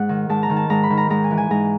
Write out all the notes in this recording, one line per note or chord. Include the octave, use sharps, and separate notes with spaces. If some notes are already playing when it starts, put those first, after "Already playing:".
Already playing: G#2 F#5
D#3
G#2 A5
A#5
D#3
A5
G#2 A#5
B5
D#3
A#5
G#2 A#5
G#5
E3
G#5
G#2 A#5